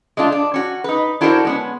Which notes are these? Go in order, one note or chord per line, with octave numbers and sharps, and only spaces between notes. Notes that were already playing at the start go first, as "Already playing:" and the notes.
G#3 A3 D4 F4
D4
C#4 F#4
D#4 B4
D4 E4 F#4 A4 A#4 C5
G#3 B3 C#4